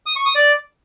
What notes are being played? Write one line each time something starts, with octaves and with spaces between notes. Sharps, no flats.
D#6
C#6
D#6
D5